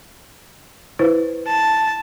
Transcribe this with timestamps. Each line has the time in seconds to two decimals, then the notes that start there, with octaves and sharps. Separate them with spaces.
0.99 E4 B4 C5
1.48 A5